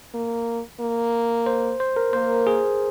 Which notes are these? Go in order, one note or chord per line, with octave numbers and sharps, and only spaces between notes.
A#3
A#3
C5
C5
A#4
A#3 C5
G#4